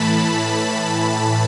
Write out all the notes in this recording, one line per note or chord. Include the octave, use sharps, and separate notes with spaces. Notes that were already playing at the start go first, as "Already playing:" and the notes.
Already playing: A2 E3 A5 B5
B5